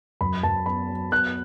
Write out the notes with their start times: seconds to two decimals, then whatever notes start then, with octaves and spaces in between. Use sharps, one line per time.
0.21 F#2 B5
0.43 F#2 A5
0.66 B3 B5
0.89 F#3
1.12 B3 F#6